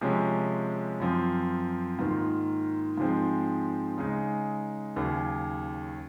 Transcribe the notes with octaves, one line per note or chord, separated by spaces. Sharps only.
C3 F3 G#3 C#4
F#2 F3 C4
G#2 D#3 A#3 F4
G#2 F3 G#3 C4
C#3 G#3 D#4
D#2 C#3 F#3